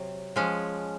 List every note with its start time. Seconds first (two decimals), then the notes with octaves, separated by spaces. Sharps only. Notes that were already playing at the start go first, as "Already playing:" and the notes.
Already playing: C3 F#3
0.36 F3 G#3 C#4